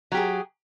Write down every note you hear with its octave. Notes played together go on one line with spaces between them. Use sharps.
F#3 G4 G#4